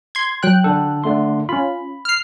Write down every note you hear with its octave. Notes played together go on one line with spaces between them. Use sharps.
C6 G#6
F#3 G5 F#6
D3 A4
D3 A3 C6
C#4 F4 B5
F6 C7